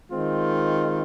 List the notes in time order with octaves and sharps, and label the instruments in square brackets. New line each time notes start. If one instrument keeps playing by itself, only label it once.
[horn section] D#3 G#3 C4 F4